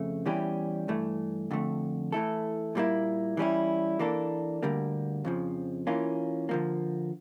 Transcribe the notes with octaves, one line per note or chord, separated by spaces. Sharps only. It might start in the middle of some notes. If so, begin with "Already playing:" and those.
Already playing: F2 C#3 A3
E2 E3 G3 C#4 G4
G2 E3 A3
F2 D3 A3
E3 A3 E4 A4
A#2 G3 A#3 E4
E3 G3 C#4 E4
E3 A#3 D4 A4
D2 D3 G3 A#3
F2 C#3 F3
E3 A#3 C#4 F4
D3 F3 A#3